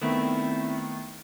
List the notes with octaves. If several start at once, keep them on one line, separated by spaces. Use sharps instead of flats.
D#3 A3 B3 C4 E4